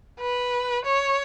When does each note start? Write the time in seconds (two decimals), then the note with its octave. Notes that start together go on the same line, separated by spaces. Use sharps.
0.19 B4
0.85 C#5